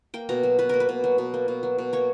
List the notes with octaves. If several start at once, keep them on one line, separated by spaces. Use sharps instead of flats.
A#3 G5
B2 A#5
F#3
B2 B4
A#3 A#4
B4
B2
F#3
B2
A#3
B2
F#3
B2
A#3 C#5